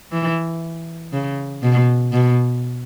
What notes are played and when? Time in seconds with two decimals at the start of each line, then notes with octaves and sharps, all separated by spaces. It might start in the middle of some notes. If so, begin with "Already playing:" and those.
0.12 E3
1.13 C#3
1.63 B2
2.12 B2